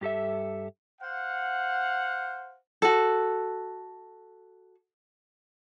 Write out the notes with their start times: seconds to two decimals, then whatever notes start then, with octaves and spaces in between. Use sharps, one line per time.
0.01 G2 G4 A4 E5
1.01 C5 F5 F#5
2.82 F#4 A4